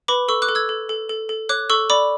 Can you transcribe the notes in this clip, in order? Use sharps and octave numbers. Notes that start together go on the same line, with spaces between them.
B4 B5 D6
A4 C#6 E6
D6 F#6
A4
E6 G#6
A4
A4
A4
A4
C#5 D6 F#6
A4 C#6 E6
D5 B5 D6